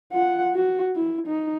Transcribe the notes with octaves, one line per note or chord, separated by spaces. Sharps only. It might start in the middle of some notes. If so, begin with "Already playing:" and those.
F4 F#5
F#4
E4
D#4